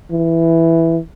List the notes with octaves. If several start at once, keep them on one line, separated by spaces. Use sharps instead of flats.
E3